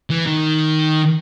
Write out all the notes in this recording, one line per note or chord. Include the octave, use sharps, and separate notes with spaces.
E3
D#3